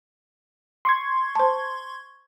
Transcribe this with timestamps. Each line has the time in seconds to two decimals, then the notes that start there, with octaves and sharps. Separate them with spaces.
0.85 C6 C#6 G#6
1.35 C5 A5